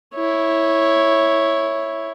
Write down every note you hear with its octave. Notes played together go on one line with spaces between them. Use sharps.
E4 C#5